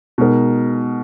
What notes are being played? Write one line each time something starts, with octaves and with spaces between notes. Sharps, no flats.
B2 G#3 D#4 A#4